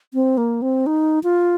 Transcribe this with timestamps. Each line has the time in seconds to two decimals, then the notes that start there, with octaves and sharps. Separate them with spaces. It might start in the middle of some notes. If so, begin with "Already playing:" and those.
0.14 C4
0.37 A#3
0.62 C4
0.86 D#4
1.23 F4